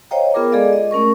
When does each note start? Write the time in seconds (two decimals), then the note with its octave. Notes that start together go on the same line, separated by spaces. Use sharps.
0.11 C5 C#5 D#5 F5 G5 A#5
0.34 B3 F4 G#4 A#4 D6
0.52 G#3 G#4 A4 D5 D#5 F5
0.73 D#5
0.91 A3 C#4 A#4 C#6